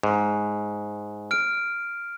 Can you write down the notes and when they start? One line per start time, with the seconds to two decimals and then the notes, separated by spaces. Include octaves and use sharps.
0.03 G#2
1.31 F6 D7